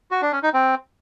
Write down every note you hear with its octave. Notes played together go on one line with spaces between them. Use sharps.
F#4
D4
C#4
D#4
C4